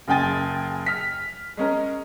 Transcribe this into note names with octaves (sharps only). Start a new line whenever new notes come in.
F#1 C#3 G5 G#5 A6
F6 B6
G#3 C#4 A#4